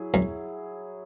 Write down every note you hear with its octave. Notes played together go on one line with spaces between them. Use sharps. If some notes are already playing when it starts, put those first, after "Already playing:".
Already playing: F#3 E4 G#4
F#2